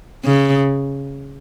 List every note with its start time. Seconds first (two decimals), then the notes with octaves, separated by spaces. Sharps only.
0.24 C#3